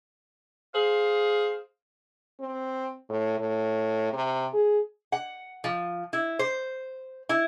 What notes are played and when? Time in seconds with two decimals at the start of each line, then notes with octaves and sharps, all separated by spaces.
0.74 G#4 C5 F5
2.40 C4
3.09 A2
3.39 A2
4.13 C3
4.53 G#4
5.12 F#5
5.64 F3
6.13 E4
6.39 C5
7.29 E4